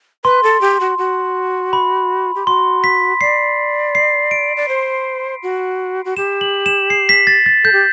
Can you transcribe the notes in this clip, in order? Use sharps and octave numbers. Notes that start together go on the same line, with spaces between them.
B4 C6
A4
G4
F#4
F#4
B5
G4
F#4 C6
B6
D5 C7
C7
D7
D5
C5
F#4
F#4
G4 E7
F#7
E7
C7
B6
A6
A6
A4 G6
G4